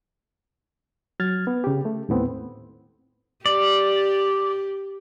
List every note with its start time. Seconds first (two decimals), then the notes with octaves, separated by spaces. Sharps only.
1.20 F#3 F6 G#6 A6
1.47 B3
1.64 C#3 G4
1.85 A3
2.09 D#2 A2 B3 C4
3.46 G4 D5